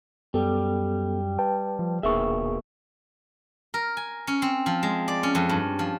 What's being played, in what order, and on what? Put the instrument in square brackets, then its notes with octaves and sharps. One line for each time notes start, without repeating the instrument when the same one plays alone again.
[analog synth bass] F#2 [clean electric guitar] G3 [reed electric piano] B3 A4
[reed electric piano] B4 G5 A5
[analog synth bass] F3
[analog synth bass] D#1 [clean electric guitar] B2 A#3 E5 [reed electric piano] G#4 C#6
[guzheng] A#4
G#5
C#4
C4
F3
G#3
D5
C#4
F2
G2
F3